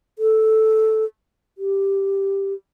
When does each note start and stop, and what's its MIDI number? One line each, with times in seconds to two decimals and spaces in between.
0.19 1.04 69
1.58 2.53 67